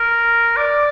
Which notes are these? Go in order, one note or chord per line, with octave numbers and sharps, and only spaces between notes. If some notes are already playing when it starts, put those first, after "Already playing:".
Already playing: A#4
D5